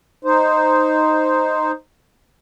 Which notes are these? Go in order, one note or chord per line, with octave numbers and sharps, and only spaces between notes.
D#4 C5